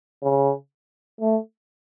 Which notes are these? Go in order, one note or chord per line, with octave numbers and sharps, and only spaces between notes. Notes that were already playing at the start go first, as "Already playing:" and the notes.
C#3
A3